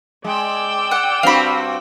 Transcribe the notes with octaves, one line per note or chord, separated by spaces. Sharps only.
G#3 D5 G5 E6
F#5
G2 C4 F#4 F5 B5